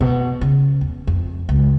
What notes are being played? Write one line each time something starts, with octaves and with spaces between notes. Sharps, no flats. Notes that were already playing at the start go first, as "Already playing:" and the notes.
B2
C#3
E2
F2
C#2